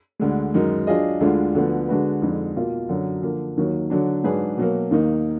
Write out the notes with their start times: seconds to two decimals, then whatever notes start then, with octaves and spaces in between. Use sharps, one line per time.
0.20 D2 D3 G#3
0.54 F#2 D#3 G#3 D#4 A#4
0.87 F#3 D4 F4 G#4 D#5
1.21 D2 D3 G#3 D4 F4
1.54 D2 D3 F3 B3
1.88 D3 G#3 D4 F#4 B4
2.22 F2 D3 G#3 D#4
2.56 B2 A#3 F4
2.89 F#2 D3 F#3
3.22 D3 F3 A#3
3.57 D#2 D#3 F#3
3.90 D3 F#3 D4
4.24 G#2 F#3 D4 G#4 B4
4.58 B2 F#3 A#3
4.91 D#2 D#3 A#3 D#4